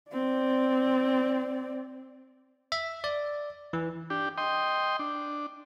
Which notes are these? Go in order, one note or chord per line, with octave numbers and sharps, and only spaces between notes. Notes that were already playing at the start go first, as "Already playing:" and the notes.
C4 D5
E5
D5
E3
D4 G4
D#5 G5 C6
D4